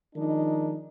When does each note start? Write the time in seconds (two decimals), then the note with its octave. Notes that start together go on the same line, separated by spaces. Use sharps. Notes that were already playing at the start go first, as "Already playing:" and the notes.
0.15 D#3 F3 G#3 D4 D#4